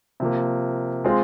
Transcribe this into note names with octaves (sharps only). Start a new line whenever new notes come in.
C3 F3 A#3
G#3 C4 F4 G#4